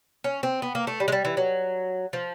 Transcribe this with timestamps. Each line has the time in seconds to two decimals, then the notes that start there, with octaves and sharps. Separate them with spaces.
0.24 C#4
0.43 C4
0.62 B3
0.75 A#3
0.87 A3
1.00 G3
1.08 G#3
1.12 G3
1.25 E3
1.37 F#3
2.13 F3